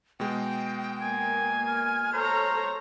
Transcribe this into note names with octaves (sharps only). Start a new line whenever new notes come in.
B2 G#3 G5
A#3 G#5
F6
A4 C5 C#5 A#5